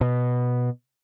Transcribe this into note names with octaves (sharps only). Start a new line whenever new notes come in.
B2